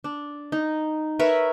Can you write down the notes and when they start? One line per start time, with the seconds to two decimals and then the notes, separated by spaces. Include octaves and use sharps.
0.04 D4
0.52 D#4
1.19 A#4 B4 C#5 E5